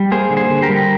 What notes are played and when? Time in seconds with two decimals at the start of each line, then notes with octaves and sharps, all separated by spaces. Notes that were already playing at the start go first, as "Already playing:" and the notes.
Already playing: G3
0.11 A#3 G#4 C5
0.30 D3
0.37 G#4 C5
0.50 D3
0.62 G4 A#4
0.69 G3